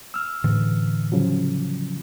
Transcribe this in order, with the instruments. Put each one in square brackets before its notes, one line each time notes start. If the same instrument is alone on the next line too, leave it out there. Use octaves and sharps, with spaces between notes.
[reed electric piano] E6 F6
[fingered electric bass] A2 D3 E3
[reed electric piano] C#3 F3 F#3